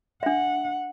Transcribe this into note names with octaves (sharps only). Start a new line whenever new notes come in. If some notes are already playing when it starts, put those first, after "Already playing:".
D4 E5 F#5